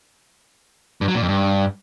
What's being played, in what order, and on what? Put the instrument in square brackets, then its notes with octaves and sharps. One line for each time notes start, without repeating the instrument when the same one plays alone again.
[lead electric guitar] G2
F#3
A#2
F2
G2